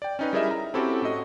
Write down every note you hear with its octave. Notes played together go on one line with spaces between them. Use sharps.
D5 G5
C#4 D#4 B4
G3 E4 G#4 A#4 D#5 E5
A#5
C4 C#4 E4 F#4 G4 A4
A2 F#4 D#5